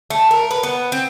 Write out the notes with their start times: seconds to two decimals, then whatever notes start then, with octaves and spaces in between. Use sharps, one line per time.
0.10 A3
0.31 A#4
0.51 B4
0.63 B3
0.92 C4